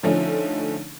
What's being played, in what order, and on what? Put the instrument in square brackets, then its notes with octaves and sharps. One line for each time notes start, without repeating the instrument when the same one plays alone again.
[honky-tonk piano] D3 F3 A3 C#4 D#4